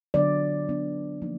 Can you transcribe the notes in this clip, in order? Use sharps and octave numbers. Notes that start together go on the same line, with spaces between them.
D3 F#3 B3 D4 D5
D3 F#3 B3 D4
F3 A#3 D#4